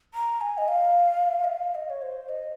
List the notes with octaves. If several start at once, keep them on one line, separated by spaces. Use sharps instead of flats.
A#5
G#5
D#5
F5
D#5
F5
D#5
C#5
C5
D#5